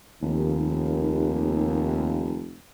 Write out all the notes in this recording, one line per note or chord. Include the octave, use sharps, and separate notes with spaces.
F1 D#2